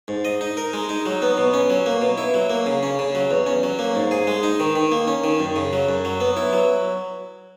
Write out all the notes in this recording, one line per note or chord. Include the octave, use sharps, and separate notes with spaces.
G#2
D#5
D#4
A#4
G#3
D#4
F#3
B3
B2
C#4
F#3
A#3
B2
E4
F#3
A#3
C#3
C#4
C#3
F#3
E2
C#4
F#3
A#3
G#2
G#4
G#3
D#4
D#3
D#3
A#3
C#4
D#3
F#2
C#3
F#3
F#2
F#3
B3
E4
F#3